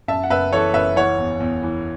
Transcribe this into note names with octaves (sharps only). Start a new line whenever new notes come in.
F#2 E5 A5
F#5
F#1 B4 E5
E3 A4 C#5
F#1 B4 E5
E3 C#5 F#5
E2
E2
E3